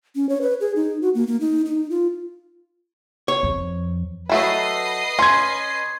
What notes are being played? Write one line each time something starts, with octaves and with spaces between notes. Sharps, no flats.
C#4
C#5
B4
G#4
D#4
F#4
A#3
A#3
D#4
D#4
F4
C#5
F2
F#3 A3 E4 B4 D#5 C7
C#4 C6 G#6